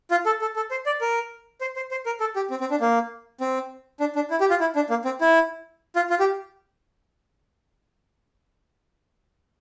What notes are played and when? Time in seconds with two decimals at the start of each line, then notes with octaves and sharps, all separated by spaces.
0.11 F4
0.26 A4
0.41 A4
0.56 A4
0.71 C5
0.86 D5
1.01 A#4
1.61 C5
1.76 C5
1.91 C5
2.06 A#4
2.20 A4
2.36 G4
2.50 C4
2.60 C4
2.71 D4
2.81 A#3
3.41 C4
4.00 D4
4.15 D4
4.31 E4
4.40 G4
4.50 F4
4.60 E4
4.76 D4
4.90 A#3
5.05 C4
5.21 E4
5.96 F4
6.10 F4
6.20 G4